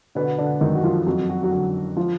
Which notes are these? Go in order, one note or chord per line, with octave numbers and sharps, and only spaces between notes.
B2 D3 B3
D3 D4
F#2 D#3 D#4
F#4
F3 F4
F2 F#3 F#4
F#4
F#3 F#4
D3
F3 F4